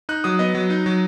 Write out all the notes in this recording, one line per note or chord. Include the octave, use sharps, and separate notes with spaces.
D#4 F#6
F#3 D#6
B3 D#5
F#3
D#4
F#3